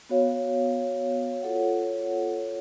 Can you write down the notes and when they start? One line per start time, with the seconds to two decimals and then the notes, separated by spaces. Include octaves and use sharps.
0.09 B3 F#4 C#5 F5
1.42 F4 A4 C#5 F#5